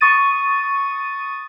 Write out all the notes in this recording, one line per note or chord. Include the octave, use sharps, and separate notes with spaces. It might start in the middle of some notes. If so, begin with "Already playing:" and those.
C#6 D#6 A6 D#7